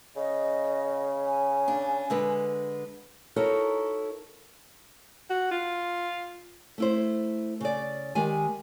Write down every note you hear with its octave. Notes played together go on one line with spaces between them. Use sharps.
C#3 D#5
G#5
D4
D3 G#3 B4
D#4 E4 F#4 A4 A#4 C#5
F#4
F4
A3 E4 C5
C#3 D5
D#3 G#3 G4 G#5